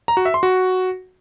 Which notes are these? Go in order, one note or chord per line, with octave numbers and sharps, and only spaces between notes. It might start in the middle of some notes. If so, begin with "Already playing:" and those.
A#5
F#4
E5
C6
F#4